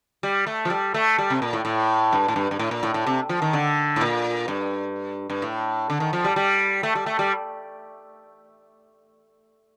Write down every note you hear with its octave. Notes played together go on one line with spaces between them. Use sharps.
G3
A3
F3
G3
A3
G3
C3
A#2
A2
A2
G2
A2
G2
G2
A2
A#2
A2
A2
C3
F3
D#3
D3
A2
A#2
G2
G2
A2
D3
D#3
F3
G3
G3
A3
G3
A3
G3